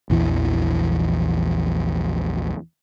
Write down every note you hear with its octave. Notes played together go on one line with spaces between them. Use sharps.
A#1 E2 E3